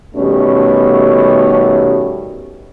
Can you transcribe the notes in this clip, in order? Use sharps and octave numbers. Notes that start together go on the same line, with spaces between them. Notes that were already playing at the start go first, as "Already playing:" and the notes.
B2 D#3 G3 A3 C#4